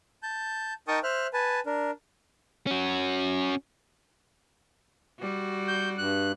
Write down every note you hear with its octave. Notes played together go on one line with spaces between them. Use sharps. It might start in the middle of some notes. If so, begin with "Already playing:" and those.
A5 G6
D#4 A#4 G5 A5 C#6 D#6
C5 E5 F6 F#6
B4 G#5 A5
D4 A#4
C#4 F#4
G3 F#4
G6
G2 F#6